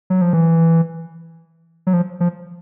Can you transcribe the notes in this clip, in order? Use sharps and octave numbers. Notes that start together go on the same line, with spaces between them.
F#3
F3
E3
F#3
F3
F3